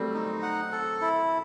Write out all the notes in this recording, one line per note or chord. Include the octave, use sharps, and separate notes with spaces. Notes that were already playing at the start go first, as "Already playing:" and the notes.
Already playing: F#3 G3 A3 C4
D#4
F#5
A4
E4